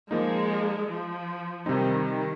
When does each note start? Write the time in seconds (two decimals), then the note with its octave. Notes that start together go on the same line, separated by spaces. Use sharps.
0.11 F3 G#3 A#3 D#4
0.89 F3
1.66 C3 D#3 G3 C4 D#4
2.05 D#3